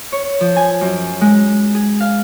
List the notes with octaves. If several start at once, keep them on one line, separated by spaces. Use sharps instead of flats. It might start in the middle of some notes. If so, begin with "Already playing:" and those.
C#5
F3
G#5
F#2
G#3
G#4
F5